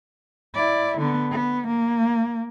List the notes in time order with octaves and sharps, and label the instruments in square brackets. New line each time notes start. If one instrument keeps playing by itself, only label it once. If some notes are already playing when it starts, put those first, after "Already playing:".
[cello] E4 D5
D3 B3
B3
A#3